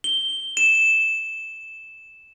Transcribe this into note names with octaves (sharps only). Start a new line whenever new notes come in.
G7
E7